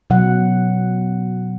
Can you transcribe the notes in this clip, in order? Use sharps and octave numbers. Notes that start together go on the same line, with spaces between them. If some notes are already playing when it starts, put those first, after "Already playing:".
B2 F#3 F#5